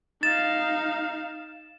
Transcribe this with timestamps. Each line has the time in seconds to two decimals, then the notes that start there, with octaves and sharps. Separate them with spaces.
0.23 D#4 F5 A6 E7